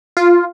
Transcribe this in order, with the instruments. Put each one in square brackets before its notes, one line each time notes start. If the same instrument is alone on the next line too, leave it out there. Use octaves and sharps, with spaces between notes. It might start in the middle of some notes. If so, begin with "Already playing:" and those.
[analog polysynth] F4